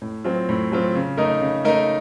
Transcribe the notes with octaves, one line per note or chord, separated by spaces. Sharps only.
A2
F#3 C4 F4
A2
F#3 C4 F4
C#3
A3 D#4 A#4 D#5
C#3
A3 D#4 A#4 D#5